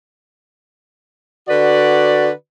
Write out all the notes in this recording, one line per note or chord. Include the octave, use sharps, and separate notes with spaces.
D3 F#4 B4 D5